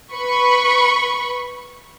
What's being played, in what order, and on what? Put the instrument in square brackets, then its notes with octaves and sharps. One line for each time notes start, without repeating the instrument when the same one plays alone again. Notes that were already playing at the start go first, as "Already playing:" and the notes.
[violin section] B4 B5 C#6